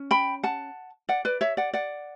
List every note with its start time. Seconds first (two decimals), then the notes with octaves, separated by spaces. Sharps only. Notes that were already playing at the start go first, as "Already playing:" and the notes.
Already playing: C#4
0.11 G5 B5
0.43 F#5 A5
1.09 D5 F#5
1.25 B4 D5
1.41 C#5 E5
1.57 D5 F#5
1.73 D5 F#5